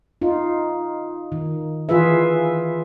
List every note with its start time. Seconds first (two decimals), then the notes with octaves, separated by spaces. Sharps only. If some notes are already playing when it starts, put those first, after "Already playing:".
0.22 D#4 F4
1.32 D#3
1.89 E3 F4 G#4 B4 E5